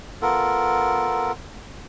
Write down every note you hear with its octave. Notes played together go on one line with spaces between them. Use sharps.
B3 F4 A4 A#4